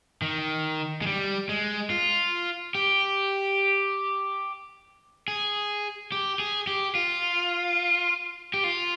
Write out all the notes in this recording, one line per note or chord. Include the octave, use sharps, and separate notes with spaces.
D#3
G#3
G3
G#3
F4
G4
G#4
G4
G#4
G4
F4
G4
F4